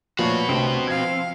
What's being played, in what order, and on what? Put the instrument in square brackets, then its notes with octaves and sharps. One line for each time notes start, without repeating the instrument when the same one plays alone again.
[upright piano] A#2 F3 [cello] A3 C#5 [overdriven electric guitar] F#4 B4
[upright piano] C2 D3 [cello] A3 [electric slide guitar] C4
[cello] F3 F5 [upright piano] G#6